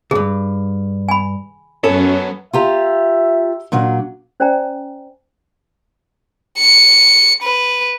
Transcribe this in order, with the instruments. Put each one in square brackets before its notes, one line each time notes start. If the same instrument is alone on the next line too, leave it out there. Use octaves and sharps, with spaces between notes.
[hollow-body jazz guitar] C#2 G2 [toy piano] G#4
[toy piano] G#5 B5
[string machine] F#2 F#3 [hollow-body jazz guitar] B3 C#4 A4
[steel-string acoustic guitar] F4 G4 A#5 [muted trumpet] E5
[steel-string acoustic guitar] A#2 F#3 D4
[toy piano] C#4 C5 D5 G5 G#5 A#5
[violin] C#7
B4